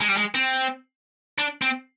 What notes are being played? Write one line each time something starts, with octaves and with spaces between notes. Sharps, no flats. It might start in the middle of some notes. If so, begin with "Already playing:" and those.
G#3
G3
G#3
C4
D4
C4